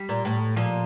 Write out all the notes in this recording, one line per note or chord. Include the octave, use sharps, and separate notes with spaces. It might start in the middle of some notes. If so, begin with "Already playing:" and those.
Already playing: G3
A#2
A2
A#2 F3